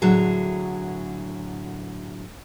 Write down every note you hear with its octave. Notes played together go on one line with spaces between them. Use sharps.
A2 D3 F#3 G#4